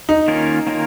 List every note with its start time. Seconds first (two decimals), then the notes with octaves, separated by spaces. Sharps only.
0.09 D#4
0.28 D#3 A#3 C#4 F4 A#4
0.67 D#3 A#3 C#4 F4 A#4